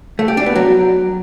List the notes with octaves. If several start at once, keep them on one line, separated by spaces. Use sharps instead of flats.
A3
G4
D4
B3
F#3